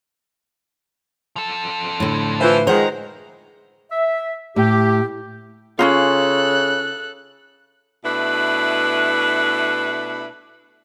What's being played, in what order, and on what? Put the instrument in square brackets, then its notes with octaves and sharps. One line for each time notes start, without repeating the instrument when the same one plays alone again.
[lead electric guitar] F3 A4
[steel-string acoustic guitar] A2 D3
[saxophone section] E3 C5 [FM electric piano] F4 B4 E5
[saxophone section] D#3 G#3 [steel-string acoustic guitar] C5 F#5 [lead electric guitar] A#5
[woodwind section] E5
[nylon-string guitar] A2 [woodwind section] G4
[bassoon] C#3 [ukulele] C#4 D#4 F4 [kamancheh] A4 F#6
[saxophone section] B2 A3 D4 E4 B4